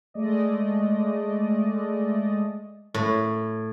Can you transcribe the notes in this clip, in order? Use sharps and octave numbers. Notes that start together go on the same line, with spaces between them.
G#3 A3 D5 D#5
A2